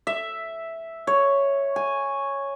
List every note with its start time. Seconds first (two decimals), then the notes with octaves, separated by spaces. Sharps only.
0.07 E5
1.07 C#5
1.76 G#5